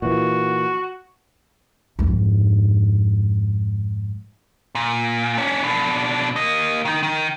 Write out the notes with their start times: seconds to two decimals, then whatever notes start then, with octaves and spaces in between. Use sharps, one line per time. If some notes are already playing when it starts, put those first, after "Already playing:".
0.02 A#2 E3 F#4
1.99 F2 G#2
4.75 A#2
5.38 C#4 D4
5.64 B2 D4
6.36 A#3 D#5
6.85 D#3 D#4
7.03 D#3